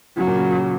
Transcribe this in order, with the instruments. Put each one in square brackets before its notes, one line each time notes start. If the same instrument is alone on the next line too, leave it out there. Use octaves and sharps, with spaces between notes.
[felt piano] C#3 [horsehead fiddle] F#3
[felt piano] A#2
C#3